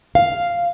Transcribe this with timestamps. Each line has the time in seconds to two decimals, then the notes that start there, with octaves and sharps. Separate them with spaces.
0.15 F5